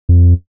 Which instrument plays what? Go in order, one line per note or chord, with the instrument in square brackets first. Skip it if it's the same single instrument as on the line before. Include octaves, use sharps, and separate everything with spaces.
[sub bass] F2